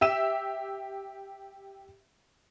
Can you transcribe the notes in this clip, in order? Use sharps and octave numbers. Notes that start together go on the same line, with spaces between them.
G4 E5 E6 E7